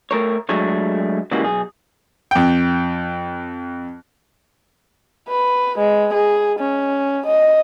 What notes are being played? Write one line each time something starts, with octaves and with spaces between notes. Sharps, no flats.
A3 A#4 C#5
F#3 G#3 A3 D4 C#5
C#3 E3 G3 G#3 A#3 F#4
B1 G#4
F2 G5
B4
G#3
G#4
C#4
D#5